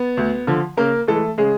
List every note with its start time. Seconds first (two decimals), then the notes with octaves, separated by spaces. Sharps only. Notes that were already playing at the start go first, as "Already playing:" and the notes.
Already playing: B3
0.17 D2
0.47 D3 F3
0.77 C#3 A#3 A#4
1.07 E3 G#3 A3 A4
1.38 C#3 G#3 G#4